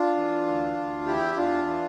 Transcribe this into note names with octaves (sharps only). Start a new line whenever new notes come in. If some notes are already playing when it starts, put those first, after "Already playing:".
Already playing: D4 F4
E3
D2
D2
E2 E4 G4
E2 D4 F4
E3